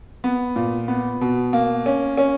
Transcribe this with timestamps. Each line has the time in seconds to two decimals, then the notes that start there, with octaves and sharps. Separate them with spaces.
0.24 B3
0.56 A#2
0.88 B3
1.21 B2
1.53 A#3
1.86 C#4
2.17 C#4